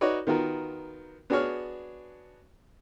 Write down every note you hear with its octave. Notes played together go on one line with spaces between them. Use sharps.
D#4 F#4 B4 C#5 D5
D#3 B3 F4 F#4 A#4
B3 D4 F#4 G#4 C#5 F6